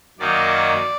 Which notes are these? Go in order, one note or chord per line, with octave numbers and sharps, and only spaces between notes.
F#2 D#3 F#3 A#3 D#4 D5